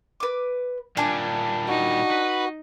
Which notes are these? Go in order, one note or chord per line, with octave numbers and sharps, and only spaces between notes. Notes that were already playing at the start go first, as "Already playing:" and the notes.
B4 D6
A#2 G3 D4 G#5 A#5
D#4 F#4
B4